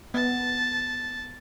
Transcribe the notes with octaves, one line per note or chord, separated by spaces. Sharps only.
B3 A5